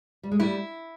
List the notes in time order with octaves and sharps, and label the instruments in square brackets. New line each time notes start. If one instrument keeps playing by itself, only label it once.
[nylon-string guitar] G3
G#3
[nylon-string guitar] G3 A3 [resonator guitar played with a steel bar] E4